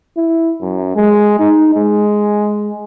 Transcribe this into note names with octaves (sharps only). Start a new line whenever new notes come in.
E4
F#2
G#3
D#4
G#3